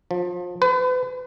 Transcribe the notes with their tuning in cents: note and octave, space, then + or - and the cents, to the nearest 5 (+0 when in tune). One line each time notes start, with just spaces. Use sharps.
F3 +30
B4 +40